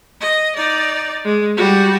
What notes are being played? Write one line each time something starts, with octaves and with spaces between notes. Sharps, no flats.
D#5
D#4 D5
G#3
G3 F#4